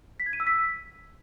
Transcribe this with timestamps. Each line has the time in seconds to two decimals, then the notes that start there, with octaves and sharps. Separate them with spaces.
0.20 B6
0.26 G#6
0.33 D#7
0.40 E6
0.47 B6